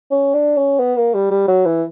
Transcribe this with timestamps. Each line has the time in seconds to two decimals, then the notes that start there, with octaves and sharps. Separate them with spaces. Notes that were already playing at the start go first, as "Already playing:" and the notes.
0.11 C#4
0.34 D4
0.57 C#4
0.79 B3
0.97 A#3
1.14 G3
1.31 G3
1.48 F#3
1.66 E3